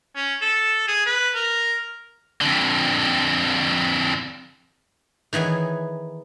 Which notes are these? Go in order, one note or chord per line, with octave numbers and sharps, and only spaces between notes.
C#4
A4
G#4
B4
A#4
F2 D3
D#3 E3 B3 G#4 C#5